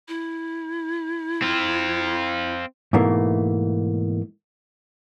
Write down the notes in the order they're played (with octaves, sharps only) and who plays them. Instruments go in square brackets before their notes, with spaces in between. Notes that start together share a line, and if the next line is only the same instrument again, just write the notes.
[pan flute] E4
[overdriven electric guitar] C4 F4
[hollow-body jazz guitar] G#2 B2 E3 A3 A#3